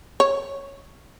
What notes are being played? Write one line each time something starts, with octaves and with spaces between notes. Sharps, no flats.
C#5